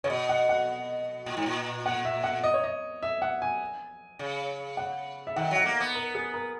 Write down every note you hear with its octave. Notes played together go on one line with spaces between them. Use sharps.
C#3 C#5
B2 D#5
F#5
F#5
A#2
G#2
A#2
F#5
E5
F#5
D#5
C#5
D#5
E5
F#5
G#5
C#3
F#5
E5
D#3 F#5
F#3 F#5
A#3
B3
A#4
G#4
A#4